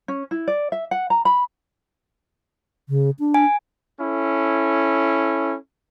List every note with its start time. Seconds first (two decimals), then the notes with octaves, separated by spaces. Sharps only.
0.08 C#4
0.31 E4
0.48 D5
0.72 E5
0.91 F#5
1.10 A#5
1.25 B5
2.89 C#3
3.19 D4
3.34 G#5
4.00 C#4 E4 A4